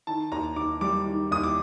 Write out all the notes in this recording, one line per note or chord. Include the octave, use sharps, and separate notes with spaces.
D#3 A5
D#2 A#5
D#2 D6
G3 D6
D#3
D#2 D#6
D6